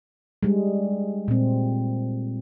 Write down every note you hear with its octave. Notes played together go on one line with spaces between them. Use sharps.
G3 G#3
A#2 C4